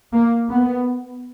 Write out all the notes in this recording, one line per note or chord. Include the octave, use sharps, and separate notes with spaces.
A#3
B3